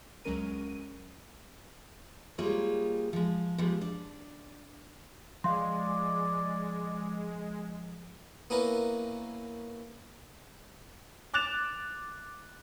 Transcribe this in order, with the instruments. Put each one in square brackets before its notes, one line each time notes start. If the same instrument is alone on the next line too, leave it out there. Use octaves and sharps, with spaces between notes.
[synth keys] C#2 F#3 G#3 C#4 A#4 D#7
[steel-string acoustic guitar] G3 G#3 A#3 F4 G#4 C#5
F3 G#3
F3 G3 G#3 B3
D4
[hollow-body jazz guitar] F3 F5 [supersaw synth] G#3 [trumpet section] D5 [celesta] C6
[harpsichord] A#3 B3 C#4 E4 A#4 B4
[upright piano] D6 F#6 A6 E7 F7